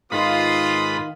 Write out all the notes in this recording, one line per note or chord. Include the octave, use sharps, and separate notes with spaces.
G#2 D#3 F4 B4 F5 B5 D#6